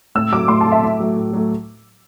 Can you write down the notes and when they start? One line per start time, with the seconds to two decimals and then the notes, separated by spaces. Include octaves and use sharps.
0.15 A2 E6
0.32 F#3 D6
0.36 A3
0.48 A2 C6
0.61 A5
0.66 F#3 A3
0.72 E5
0.83 A2
1.00 F#3 A3
1.17 A2
1.33 F#3 A3